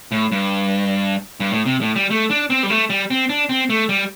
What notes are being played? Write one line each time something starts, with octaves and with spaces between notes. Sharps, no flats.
A2
G2
G2
A2
C3
A2
G3
A3
D4
C4
G3
A3
G3
C4
D4
C4
A3
G3